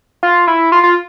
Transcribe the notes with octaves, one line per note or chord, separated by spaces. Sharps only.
F4
E4
F4
F4